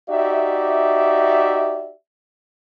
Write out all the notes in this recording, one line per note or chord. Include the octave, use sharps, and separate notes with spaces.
D#4 F#4 G4 D5 E5